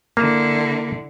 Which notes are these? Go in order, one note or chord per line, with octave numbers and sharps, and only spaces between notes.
D3 A#3 E4